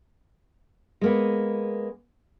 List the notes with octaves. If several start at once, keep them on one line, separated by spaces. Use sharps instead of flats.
G#3 A#3 B3